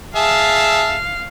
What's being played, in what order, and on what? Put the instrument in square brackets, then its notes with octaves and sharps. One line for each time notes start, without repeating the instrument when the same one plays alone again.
[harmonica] G#4 E5 A5 [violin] F5